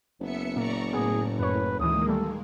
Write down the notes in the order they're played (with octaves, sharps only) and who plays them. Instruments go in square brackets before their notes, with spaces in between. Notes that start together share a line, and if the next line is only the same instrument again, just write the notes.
[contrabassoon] F#1 [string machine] B3 E5 C#7
[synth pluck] A#2 A#3 [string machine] D5 A#5 C#6
[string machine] A2 [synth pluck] B3 [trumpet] G#4
[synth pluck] F#2 C#5 [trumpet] B4
[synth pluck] D2 E3 [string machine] D#3 G#3 A#3 [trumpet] D#6
[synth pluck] G3 A3 [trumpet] A4